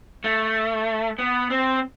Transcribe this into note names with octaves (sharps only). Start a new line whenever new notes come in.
A3
B3
C4